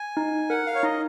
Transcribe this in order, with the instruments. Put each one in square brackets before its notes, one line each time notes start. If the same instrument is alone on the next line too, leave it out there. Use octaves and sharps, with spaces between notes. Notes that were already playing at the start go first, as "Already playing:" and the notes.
Already playing: [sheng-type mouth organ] G#5
[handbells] D#4
[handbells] A#4 [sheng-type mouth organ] F#5
[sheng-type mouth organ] F5
C#5
[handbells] D#4 [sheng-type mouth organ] D#5